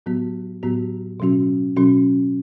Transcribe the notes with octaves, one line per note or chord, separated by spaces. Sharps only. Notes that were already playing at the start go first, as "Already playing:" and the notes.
A2 F#3 B3 F#4
A2 F#3 B3 F#4
B2 F#3 C#4 F#4
B2 F#3 C#4 F#4